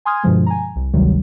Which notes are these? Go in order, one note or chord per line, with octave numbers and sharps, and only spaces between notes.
G#5 C6 D#6 F6 G#6
G2 B2 D3 F3 G#3
G#5 A#5
C2
G#1 D2 C3 D#3 F#3 G3